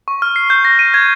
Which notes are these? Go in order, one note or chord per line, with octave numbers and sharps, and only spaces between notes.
C#6
F6
C7
G6
A#6
D#7
G#6